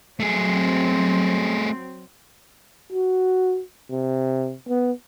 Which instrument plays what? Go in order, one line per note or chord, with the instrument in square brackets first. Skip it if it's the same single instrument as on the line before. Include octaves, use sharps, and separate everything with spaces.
[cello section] F#3 C4 [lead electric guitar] A3 G#4
[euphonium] F#4
C3
B3